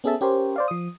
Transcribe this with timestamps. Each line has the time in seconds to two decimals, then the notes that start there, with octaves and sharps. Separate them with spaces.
0.04 B3 C#4 G#4 A4 E5 A5
0.21 C#4 G4 A#4 C5 C#5
0.56 C5 D5 F5
0.68 F3 D#6